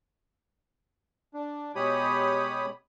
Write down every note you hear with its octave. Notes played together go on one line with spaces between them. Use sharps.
D4
B2 G#3 G4 C#5 B5 D#6